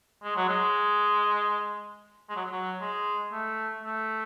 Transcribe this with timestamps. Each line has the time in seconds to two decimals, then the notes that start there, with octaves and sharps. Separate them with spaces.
0.24 G#3
0.36 F#3
0.49 G#3
2.29 G#3
2.36 F#3
2.51 F#3
2.81 G#3
3.32 A3
3.83 A3